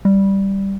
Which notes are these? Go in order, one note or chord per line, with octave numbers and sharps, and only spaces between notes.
G3